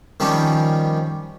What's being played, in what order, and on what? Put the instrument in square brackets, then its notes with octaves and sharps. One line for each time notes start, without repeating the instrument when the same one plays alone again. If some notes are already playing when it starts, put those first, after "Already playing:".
[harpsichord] D#3 F3 G3 C#4